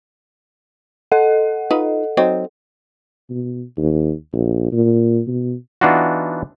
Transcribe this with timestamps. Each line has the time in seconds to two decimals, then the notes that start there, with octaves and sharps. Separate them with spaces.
1.12 A4 D#5 F#5
1.71 D#4 F4 B4
2.17 F#3 C4 D#4
3.30 B2
3.78 D#2
4.33 A#1
4.72 A#2
5.27 B2
5.81 E3 B3 D4 D#4 F4 F#4